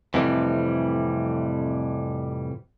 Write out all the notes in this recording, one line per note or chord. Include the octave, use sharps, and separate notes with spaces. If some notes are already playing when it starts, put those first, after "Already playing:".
F2 A2 C3 E3 G3